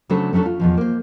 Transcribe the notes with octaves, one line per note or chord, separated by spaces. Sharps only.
C#3 F#3 A3 D4 A4 C5
F#3 A3 C#4 D4 A4
F4
E2 B2 F3
A#3 C5